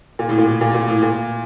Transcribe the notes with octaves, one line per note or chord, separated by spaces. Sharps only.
A#2
A2
A#2
A#2
A#2
A2
A#2